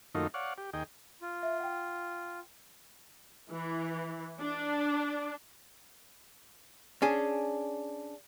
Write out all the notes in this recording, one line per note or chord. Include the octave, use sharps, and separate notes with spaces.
F#2 D#3 A3 A#3 D#4 F4
C#5 D5 F5 F#5
G4
D#2 G#4 D#5 G5
F4
E5
F#5 G5
E3
D4
C#4 D4 G#4